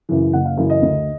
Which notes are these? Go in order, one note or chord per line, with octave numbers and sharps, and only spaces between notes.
F#2 C#3 E3
F#1 F#5
F5
F#2 C#3 E3
D#5
D2